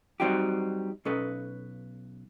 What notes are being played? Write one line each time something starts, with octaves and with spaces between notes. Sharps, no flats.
F#3 G3 C4 D#4 F#4 G4
B1 C#4 A4 B4 D#5